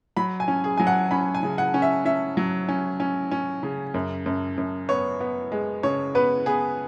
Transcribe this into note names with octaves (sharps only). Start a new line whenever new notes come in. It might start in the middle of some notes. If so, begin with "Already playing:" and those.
F#3 B5
G#5
C#4
G#4
F#3 G#5
F#5
C#4 B5
G#5
C#3
F#5
C#4
E5
C#4 E5
F#3
C#4
C#4
C#4
C#3
F#2
F#2
F#2
B3 C#5
B3
G#3
C#3 C#5
B3 B4
B3 G#4